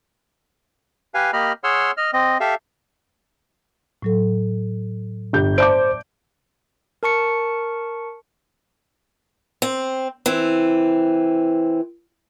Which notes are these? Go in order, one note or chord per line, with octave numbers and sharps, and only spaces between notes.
G4 B4 F5 G#5
A#3 G4 D#5 B5 F6
G#4 C#5 F#5 C6 E6 F6
D#5 F6
C4 D#5
G4 A4 E5 F5
A2 F#3 A4
G1 G4 G6
C5 D5 E5 A5 D6 G6 D7
A#4 A5 C#6 C#7
C4
E3 C4